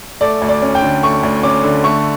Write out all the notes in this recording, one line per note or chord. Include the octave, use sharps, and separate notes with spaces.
A3 D5
D2
D5
C#4
G5
D3
A3 C#6
D2
C#4 D6
D3
A3 C#6